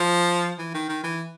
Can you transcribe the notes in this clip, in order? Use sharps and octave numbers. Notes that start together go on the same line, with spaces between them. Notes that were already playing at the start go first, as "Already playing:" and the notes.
Already playing: F3
E3
D#3
D#3
E3